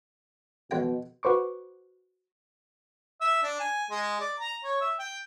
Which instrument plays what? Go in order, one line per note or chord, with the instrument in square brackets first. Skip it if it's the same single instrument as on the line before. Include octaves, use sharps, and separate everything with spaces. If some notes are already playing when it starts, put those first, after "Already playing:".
[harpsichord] F2 G5 [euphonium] B2
[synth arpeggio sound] F#4 B4 C5 C#6 D6
[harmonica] E5
D4
G#5
G#3
D5
A#5
C#5
E5
G5